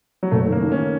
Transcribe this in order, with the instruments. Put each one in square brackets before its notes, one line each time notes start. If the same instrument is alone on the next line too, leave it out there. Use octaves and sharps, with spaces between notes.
[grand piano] F#3
[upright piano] F#1 [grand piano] A3
[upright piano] D#3
[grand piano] A#3
[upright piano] D#3
[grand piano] C#4
[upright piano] D#3